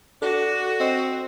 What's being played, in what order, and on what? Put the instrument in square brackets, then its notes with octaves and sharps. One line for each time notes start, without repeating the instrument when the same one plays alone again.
[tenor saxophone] D4 [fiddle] F#4 [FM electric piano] A4
[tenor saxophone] C4 [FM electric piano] D#5